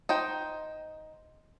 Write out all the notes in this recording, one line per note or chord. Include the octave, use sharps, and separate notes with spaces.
D#4 C5 G5